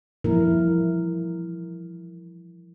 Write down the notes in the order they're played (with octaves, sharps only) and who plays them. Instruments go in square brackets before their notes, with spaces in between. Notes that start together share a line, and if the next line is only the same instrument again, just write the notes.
[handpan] E3 F3 G3 A#3 E4 A#4